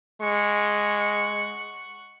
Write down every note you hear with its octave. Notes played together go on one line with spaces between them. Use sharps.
G#3 F#5 C#6